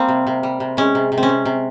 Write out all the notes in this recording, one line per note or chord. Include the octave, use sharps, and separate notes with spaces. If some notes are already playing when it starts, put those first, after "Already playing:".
Already playing: G3 A#3 C4
C3
C3
G3
C3
G#3 C#4
C3
C3
C4
C#4
C3
C3